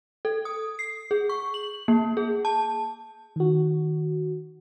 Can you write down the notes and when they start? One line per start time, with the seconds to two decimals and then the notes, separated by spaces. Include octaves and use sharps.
0.25 A4
0.45 D#6
0.79 C7
1.11 G#4
1.29 C#6
1.54 F#7
1.88 A#3
2.17 G#4
2.45 A5
3.36 D#3 F#4